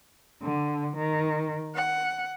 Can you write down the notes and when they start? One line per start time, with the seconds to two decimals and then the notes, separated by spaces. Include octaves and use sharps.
0.42 D3
0.97 D#3
1.75 F#5